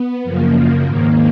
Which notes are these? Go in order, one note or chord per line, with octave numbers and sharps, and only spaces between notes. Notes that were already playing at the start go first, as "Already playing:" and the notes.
Already playing: B3
F#2 C#3 F3 A#3
G#2 D#3 A#3